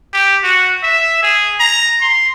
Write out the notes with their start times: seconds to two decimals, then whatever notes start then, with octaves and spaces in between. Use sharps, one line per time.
0.13 G4
0.43 F#4
0.83 E5
1.23 G#4
1.60 A#5
2.01 C6